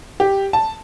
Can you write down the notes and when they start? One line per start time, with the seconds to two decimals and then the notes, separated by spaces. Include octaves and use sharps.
0.20 G4
0.53 A5